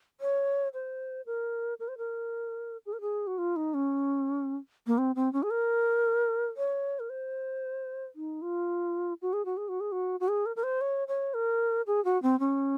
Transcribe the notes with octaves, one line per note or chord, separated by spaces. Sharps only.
C#5
C5
A#4
A#4
C5
A#4
G#4
A#4
G#4
F#4
F4
D#4
C#4
A#3
C4
C4
C#4
G#4
A#4
C#5
A#4
C5
D#4
F4
F#4
G#4
F#4
G#4
F#4
G#4
F#4
F#4
G#4
A#4
A#4
C5
C#5
C#5
A#4
G#4
F#4
C4
C#4